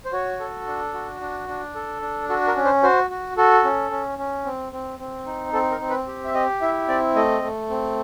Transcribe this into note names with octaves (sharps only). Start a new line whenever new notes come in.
C5
F#4 C#5
A4
D4
F#4
D4
D4
A4
D4
F#4 A4
A#4
C#4
C5
F#4 C5
F#4
F#4 A4
C#4
C#4
C#4
C4
C4
C4
D#4
C4 A4
A#4
C4
B4
G4
E5
G4 D#5
E4 E5
C4 D5
A3 D#5
A3
C4